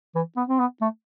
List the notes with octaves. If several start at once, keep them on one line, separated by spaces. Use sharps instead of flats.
E3
B3
C4
B3
A3